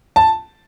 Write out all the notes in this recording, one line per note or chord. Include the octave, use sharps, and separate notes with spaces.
A5